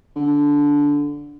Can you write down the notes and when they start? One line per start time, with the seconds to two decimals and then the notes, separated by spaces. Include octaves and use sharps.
0.15 D3